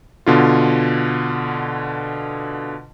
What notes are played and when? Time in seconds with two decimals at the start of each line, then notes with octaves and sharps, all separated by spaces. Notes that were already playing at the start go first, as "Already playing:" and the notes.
0.26 B2 D3 F4